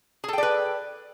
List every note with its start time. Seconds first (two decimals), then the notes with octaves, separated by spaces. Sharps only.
0.24 G#4
0.28 A4
0.33 G5
0.38 D5
0.43 B4